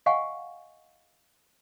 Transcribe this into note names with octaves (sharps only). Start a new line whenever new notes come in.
D#5 F5 F#5 G#5 C#6